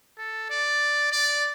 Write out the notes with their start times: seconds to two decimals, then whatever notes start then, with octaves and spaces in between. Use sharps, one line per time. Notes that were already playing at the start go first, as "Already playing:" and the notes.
0.18 A4
0.50 D5
1.12 D5